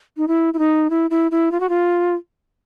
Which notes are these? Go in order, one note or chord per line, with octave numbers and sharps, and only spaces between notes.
D#4
E4
E4
D#4
E4
E4
E4
F4
F#4
F4